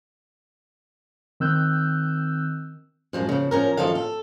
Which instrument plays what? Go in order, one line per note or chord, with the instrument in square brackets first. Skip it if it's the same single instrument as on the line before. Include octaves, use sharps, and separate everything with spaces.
[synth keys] D#3 C4 E6 F#6 G6
[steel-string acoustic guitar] F#2 F3 G#3
C#3 F3
F3 C#4 A#4
F#2 D#3 F3 A4 F5
A4